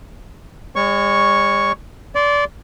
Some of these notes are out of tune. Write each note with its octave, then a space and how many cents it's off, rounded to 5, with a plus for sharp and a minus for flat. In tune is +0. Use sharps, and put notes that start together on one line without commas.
G#3 -45 C#5 +0 C#6 +0
D5 -20 C6 +0